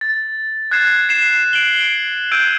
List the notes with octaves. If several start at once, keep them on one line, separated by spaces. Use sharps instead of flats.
A6
F#6 G#6 A6 C7 E7
C7 E7
D7 F#7 G7
D7
E6 G6 G#6 D7 D#7